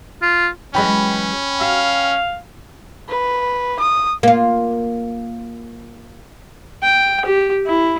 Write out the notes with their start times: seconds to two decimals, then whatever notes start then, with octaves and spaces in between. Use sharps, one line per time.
0.22 F4
0.75 E3 F#3 G#3 C#4 G5 B5
1.61 F#4 F5
3.08 B4
3.79 D#6
4.23 A#3 F4
6.82 G5
7.25 G4
7.66 E4